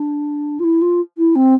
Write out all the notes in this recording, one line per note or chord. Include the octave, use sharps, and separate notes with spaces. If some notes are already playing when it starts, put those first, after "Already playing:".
Already playing: D4
F4
E4
F4
E4
C4